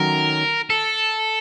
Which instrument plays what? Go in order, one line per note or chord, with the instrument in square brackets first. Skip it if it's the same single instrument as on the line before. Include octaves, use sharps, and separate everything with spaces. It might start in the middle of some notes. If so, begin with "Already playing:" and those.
Already playing: [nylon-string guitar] D#3 F#3 A3 C#4 F#4 [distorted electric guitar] A#4
[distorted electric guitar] A4